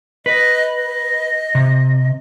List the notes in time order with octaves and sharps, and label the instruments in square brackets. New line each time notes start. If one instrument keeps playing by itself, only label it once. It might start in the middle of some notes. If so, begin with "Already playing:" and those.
[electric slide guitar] B4 [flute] D#5
[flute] D#5
[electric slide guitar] C3